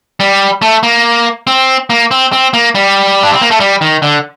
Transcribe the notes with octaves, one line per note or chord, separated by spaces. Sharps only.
G3
A3
A#3
C4
A#3
C4
C4
A#3
G3
D4
C4
A#3
A3
G3
D#3
D3